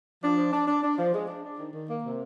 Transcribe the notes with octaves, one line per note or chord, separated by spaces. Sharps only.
F3 D4
F3
D4
D4
D4
F3
G#3
D4
D4
D#3
D#3
A#3
C3